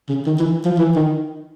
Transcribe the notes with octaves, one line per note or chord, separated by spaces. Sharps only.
C#3
D#3
E3
F3
E3
D#3